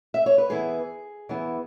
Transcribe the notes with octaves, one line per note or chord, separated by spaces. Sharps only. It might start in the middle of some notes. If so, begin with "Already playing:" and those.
E5
C#5
B4
E2 E3 B3 E4 G#4
E2 E3 B3 E4